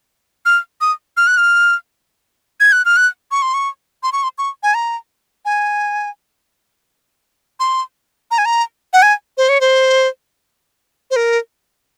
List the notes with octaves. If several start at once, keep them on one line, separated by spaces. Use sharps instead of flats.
F6
D#6
F6
F#6
F6
G#6
F#6
F6
F#6
C#6
C6
C#6
C6
C#6
C6
C#6
G#5
A#5
G#5
C6
A#5
G#5
A#5
F#5
G#5
C5
C#5
C5
C5
A#4